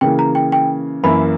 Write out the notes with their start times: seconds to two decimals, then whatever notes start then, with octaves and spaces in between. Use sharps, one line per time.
0.01 C#3 E3 A#3 G5
0.19 A#5
0.35 G5
0.52 G5
1.03 F#2 E3 A#3 E4 B5